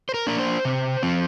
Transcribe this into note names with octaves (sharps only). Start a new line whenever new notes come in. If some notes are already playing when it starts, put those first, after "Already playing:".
C5
A#4
A#3 D4 A#4
C5
C3
F3 C4